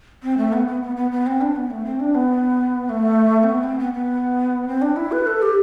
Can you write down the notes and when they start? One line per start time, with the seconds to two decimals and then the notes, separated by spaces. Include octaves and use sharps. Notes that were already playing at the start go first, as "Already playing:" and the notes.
0.23 C4
0.38 A3
0.53 B3
0.67 B3
0.83 B3
0.96 B3
1.11 B3
1.26 C4
1.41 D4
1.56 B3
1.70 A3
1.85 C4
2.00 D4
2.15 B3
2.89 A3
3.43 C4
3.49 B3
3.63 C4
3.79 B3
3.94 B3
4.68 C4
4.82 D4
4.96 E4
5.12 B4
5.27 A4
5.42 G4